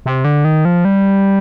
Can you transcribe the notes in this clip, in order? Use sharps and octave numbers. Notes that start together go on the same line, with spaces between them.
C3
D3
D#3
F3
G3